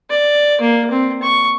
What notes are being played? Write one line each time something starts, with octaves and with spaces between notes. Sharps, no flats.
D5
A#3
C4
C#6